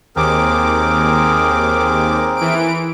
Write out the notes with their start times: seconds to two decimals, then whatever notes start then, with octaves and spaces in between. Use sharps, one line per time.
0.16 D#2 C4 G#4 A#4 D6
2.36 E3 D7